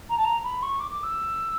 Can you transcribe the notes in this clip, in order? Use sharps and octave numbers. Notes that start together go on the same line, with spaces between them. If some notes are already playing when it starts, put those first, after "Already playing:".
A#5
A5
A#5
B5
C#6
D6
D6
E6